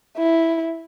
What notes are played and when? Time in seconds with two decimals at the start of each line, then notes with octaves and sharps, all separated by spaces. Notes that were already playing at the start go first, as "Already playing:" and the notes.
0.17 E4